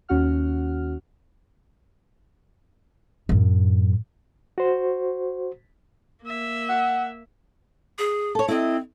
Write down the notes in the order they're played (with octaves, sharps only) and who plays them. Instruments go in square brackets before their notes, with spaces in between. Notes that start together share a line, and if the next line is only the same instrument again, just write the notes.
[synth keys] D#2 C#4 F#4 F#5 F6
[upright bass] F#2 A2
[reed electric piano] F#4 C5
[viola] A#3 E5
[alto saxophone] F#5
[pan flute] G#4
[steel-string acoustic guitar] A4 C#5
[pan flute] C4 [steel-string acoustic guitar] E4 D#5